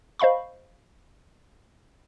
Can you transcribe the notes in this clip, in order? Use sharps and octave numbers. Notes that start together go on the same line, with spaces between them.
C5 D#5 F5 B5 C#6